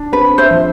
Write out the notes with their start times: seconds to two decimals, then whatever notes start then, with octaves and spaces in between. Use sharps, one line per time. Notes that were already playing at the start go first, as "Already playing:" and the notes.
Already playing: D4
0.12 C4 B4
0.38 C5 E5
0.51 F3